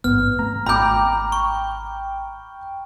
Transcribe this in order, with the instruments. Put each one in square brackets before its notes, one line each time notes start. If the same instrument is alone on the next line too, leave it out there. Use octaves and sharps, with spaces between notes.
[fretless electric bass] A1 G#2 [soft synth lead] B3 [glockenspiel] F6
[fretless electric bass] A3 C4 [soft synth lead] A#5
[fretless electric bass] G#1 [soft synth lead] G5 [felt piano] A#5 D6 [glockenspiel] B5 G6
[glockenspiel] C#6